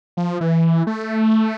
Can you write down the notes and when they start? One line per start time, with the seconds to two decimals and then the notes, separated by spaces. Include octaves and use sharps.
0.17 F3
0.41 E3
0.87 A3